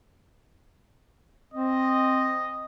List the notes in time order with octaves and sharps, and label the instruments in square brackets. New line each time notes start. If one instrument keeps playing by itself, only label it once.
[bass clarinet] C4 [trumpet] D#5